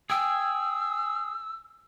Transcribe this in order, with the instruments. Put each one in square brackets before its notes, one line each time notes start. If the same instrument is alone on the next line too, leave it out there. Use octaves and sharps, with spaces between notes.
[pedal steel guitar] G#4 G5 G#5 [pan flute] E6